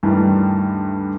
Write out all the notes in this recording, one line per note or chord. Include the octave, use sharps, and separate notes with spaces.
D2 G2 D#3 E3 G3